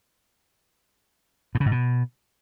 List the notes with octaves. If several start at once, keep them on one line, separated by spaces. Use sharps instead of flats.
A2
C#3
G#2
B2